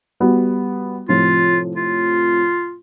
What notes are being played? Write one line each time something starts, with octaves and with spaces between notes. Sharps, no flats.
G3 B3 F#4
A2 C3 F3 F4
F4